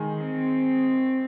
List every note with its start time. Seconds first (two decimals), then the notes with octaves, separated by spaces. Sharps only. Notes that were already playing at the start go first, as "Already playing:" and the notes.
Already playing: D#3 G#3 D#4 G#4
0.22 C4